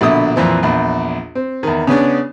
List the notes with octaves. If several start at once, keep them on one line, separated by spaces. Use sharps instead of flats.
A#1 B2 D3 E4 D#6
F2 A#2 E3 C4
A#1 E2
C4
E2 D#3
C#3 B3 C#4 D4